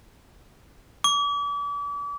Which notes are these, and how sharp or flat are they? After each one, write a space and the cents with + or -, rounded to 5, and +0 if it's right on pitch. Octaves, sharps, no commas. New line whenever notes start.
D6 -40